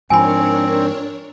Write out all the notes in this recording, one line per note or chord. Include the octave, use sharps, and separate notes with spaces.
G#2 F3 C4 D4 A#4 C#5 G#5 B5